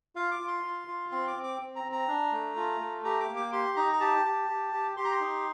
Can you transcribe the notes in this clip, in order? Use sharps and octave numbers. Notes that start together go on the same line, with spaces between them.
F4 F5
D6
F4
C6
F4
F4
C4 C6
D6
C4
D6
C4
A#5
C4
A#5
D4
A3
F4
A3
G4 A#5
D6
A#3
D6
G4 C6
D#4 A#5
A#5
G4 A5
G4
G4
G4
G4 C6
A#5
C6
D#4